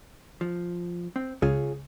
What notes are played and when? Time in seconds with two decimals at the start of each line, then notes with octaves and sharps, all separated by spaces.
0.41 F3
1.16 C4
1.42 C#2 F4 G#4 C#5